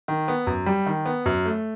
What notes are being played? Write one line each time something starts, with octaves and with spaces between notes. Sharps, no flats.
D#3
B3
F#2
G3
D#3
B3
F#2
A3